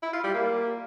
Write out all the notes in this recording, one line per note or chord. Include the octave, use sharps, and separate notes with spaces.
E4
F4
G3
A#3